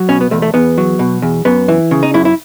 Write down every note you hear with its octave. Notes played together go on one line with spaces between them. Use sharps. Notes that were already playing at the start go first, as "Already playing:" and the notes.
Already playing: F#3
B2 C#4
B3
E2 A3
A3
E2 B3
F#3
B2
E2
F#2 B3
E3
C#3
D#4
F#2 E4
E4